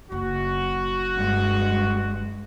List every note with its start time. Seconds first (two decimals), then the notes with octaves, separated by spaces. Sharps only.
0.12 F#1 F#4
1.14 G2 G#3